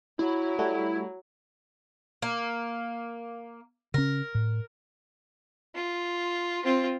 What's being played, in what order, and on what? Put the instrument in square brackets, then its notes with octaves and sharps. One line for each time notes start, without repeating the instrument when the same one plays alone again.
[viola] F#3 [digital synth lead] E4
[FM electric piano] G3 A3 F#4
[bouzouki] A#3
[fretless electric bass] C#3 C#4 [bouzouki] A#4
[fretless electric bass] A2
[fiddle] F4
C4 F4